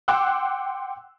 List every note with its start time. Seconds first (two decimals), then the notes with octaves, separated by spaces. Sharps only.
0.08 F#5 G5 C6 D6 E6 F#6